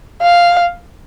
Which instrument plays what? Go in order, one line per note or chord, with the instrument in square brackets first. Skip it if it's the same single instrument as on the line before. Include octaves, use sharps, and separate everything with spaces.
[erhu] F5